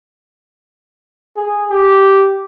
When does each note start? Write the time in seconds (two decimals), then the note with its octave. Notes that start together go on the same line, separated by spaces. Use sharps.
1.36 G#4
1.70 G4